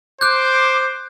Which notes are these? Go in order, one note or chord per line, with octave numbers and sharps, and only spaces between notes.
C5 D6 F#6 G6